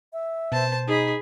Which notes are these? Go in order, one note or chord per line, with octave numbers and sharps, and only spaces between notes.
E5
B2 C5 A5
D#4 G#4 B5